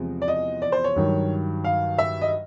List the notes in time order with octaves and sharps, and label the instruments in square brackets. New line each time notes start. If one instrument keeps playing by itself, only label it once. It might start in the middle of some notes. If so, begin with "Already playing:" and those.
Already playing: [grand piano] E2 C3 F3 G#3
D5
D#5
D5
C5
C#5
G2 D#3 F#3
F5
E5
D#5